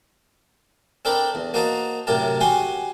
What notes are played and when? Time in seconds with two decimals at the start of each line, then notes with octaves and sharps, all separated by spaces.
1.05 C4 D4 A4 A#4 G5 B5
1.35 E2
1.54 A#3 F#4 C5 D#5 A5 A#5
2.07 F#2 A2 C3 G4 A#4 A5
2.41 C#4 F#4 G4 C#5 G#5 C6